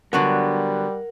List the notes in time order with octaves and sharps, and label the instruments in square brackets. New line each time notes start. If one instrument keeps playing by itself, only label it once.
[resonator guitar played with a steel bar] D3 F#3 B3 [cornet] G3 [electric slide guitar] A#4 F#5